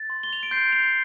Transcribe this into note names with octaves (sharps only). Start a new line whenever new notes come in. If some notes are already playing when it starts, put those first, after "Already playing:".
Already playing: A6
C6
G7
F7
D7
C6 G6 C7
C7 F7